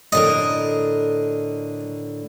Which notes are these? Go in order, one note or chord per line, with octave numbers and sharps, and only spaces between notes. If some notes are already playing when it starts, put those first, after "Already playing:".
A2 D3 A#4 D#5